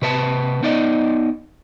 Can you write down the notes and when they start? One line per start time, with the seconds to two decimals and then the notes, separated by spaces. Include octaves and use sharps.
0.02 C3 B4 C#5 A5
0.63 B3 D#4 D5 D#5